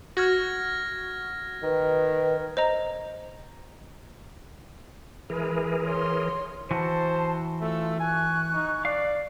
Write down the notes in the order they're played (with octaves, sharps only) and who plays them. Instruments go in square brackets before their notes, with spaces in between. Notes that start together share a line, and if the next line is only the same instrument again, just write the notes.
[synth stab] F#4 [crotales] F6 G#6 A#6
[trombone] D#3 [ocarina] B4
[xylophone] C5 D#5 A#5
[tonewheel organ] E3 G#4 A#4 [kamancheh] G#3 B4
[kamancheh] C#5 C6
[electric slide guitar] E3 F#4 [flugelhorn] C5 [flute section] A5
[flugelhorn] A3 [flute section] F4 E6
[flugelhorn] G#5 [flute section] C#6 F#6
[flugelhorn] D#4
[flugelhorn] D5 [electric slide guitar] F5